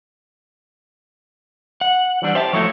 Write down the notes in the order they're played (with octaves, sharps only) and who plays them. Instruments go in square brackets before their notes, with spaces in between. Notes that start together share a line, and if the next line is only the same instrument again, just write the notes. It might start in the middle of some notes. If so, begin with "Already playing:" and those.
[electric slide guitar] F#5
[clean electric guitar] E3 G3 D4
[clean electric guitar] G4 [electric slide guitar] C5 E5 A5
[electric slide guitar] F3 F#3 E4 [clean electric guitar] A3 A4 C#5